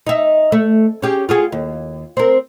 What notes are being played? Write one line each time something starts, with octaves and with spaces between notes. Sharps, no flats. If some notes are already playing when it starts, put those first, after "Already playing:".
D#4 E5
A3
C#4 G4 G#4
F4 F#4 G#4
D#2
C4 A#4